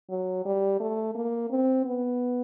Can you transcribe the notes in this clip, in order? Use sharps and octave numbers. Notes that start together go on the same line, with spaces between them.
F#3
G3
A3
A#3
C4
B3